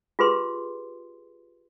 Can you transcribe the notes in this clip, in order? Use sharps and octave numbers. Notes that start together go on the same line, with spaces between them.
F4 G4 G#4 B4 C6